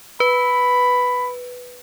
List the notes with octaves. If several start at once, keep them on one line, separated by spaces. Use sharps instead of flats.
B4 B5